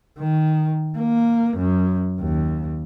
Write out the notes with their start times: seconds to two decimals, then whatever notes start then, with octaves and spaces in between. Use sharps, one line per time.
0.18 D#3
0.98 A#3
1.57 F#2
2.20 D#2